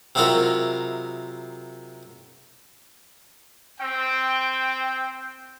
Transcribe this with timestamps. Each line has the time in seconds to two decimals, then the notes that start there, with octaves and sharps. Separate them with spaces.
0.15 C3 F#3 G#3 E4 F4 A#4
3.81 C4 G5